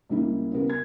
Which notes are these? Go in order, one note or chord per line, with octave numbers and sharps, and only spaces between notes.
C#2 C#3 G3 A#3 E4
C#3 B3 G4 A#4
G#6